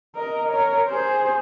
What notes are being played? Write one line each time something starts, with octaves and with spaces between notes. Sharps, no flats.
A#4 D#5
A#4 C#5
G#4 C5